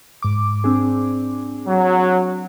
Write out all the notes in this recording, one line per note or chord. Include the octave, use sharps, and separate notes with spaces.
G#2 D6
C4 D4 G#4
F#3